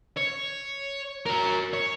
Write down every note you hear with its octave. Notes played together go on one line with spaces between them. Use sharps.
C#5
F#4 A#4
C#5